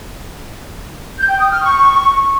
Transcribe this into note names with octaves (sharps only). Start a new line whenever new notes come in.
G6
G5
D#6
F6
C#6